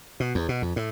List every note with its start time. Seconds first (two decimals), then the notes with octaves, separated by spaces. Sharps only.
0.20 B2
0.35 E2
0.49 B2
0.62 F2
0.76 A2